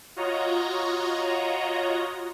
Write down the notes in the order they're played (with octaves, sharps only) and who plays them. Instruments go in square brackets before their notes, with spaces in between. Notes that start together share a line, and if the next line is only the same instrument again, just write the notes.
[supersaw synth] F4 F#4 C#5 D#5 A#5